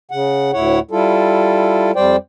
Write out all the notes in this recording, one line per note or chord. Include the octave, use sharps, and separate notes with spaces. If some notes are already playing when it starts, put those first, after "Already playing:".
C#3 F#5
D2 A2 E4 C#5 F#5
G3 E4 F4 A4
F2 G3 C5 D5 G5